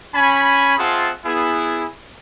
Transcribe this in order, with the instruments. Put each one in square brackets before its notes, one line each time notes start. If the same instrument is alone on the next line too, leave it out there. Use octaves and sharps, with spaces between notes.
[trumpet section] C#4 G#5 B5
C4 F4 G#4 E5 F#5 A5
B3 E4 G#4